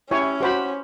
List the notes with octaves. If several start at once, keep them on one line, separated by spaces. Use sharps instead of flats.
C#4 E4 G4 C#5 G#5
F#4 G4 C5 F#5 G5 B5